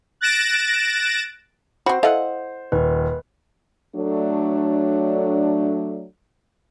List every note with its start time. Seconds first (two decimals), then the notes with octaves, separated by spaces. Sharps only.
0.21 F#6 A6 A#6 D7 E7
1.86 C4 F#4 C5 B5
2.03 E4 A4 D#5 F5 F#5
2.72 D#1 B4
3.96 F#3 A3 D4